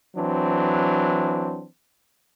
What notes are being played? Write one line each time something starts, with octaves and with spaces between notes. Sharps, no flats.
E3 F#3 C4 D4